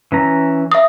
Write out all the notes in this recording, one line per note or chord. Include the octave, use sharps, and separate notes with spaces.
E3 C#4 A#5
E5 D#6